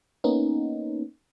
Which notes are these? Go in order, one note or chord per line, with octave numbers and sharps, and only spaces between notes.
A#3 B3 C#4 D#4